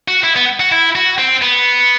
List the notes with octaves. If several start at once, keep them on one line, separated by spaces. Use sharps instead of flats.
F#4
E4
B3
F#4
E4
F#4
C4
B3